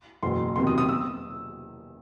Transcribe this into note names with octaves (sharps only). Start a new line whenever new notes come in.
F#1 E2 B2 C6
E2 C3 D#3 F#3 C6
D#6
D#6
E6